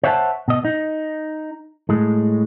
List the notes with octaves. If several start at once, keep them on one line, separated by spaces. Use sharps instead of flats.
C5 C#5 E5 F#5 G5 A5
B2 D#5
D#4
A2 G#3